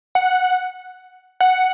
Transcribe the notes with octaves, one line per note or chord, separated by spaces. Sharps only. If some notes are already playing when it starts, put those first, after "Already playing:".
F#5
F#5